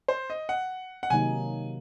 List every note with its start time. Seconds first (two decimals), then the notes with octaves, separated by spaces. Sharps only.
0.08 C5
0.30 D#5
0.49 F#5
1.03 F#5
1.10 C3 D#3 F#3 A#3 D#4 G#5